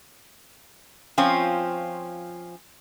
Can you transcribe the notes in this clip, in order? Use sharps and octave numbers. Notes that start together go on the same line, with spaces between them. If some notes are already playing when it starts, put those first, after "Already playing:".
F3 C4 C#4 F4